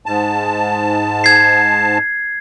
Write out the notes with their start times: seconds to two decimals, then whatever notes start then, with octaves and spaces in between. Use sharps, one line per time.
0.06 G#2 A5
1.24 G#6 C7